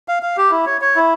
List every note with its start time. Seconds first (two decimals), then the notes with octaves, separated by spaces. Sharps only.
0.08 F5
0.23 F5
0.37 G4
0.51 E4
0.66 C#5
0.81 C#5
0.96 E4